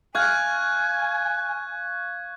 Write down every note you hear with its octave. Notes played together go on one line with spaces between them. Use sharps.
F5 G#5 C#6 F#6 G#6